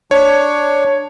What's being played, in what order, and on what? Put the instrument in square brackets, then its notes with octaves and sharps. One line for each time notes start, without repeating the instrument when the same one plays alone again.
[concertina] D4 [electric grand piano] C#5